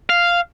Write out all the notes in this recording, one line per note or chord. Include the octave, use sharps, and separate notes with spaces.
F5